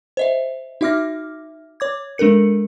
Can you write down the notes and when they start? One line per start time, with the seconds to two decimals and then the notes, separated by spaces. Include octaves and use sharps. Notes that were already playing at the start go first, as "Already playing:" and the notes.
0.17 C5 D#5 E5
0.81 D#4 F#4 E5 D6 F6 A#6
1.80 C#5 D6 G#6
2.18 G#3 D4 A4 A#4 C#7